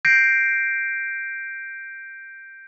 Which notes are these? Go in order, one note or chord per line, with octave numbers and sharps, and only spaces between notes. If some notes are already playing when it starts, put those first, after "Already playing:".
G6 A#6 C7 D7